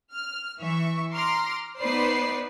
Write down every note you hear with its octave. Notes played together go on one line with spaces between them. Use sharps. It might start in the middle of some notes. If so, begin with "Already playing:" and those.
F6
E3 E5 C#6
A#5 C6 D6 F6
B3 D#4 B4 C5 D5 C7